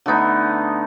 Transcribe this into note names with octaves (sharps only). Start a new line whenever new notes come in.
D3 A3 B3 D#4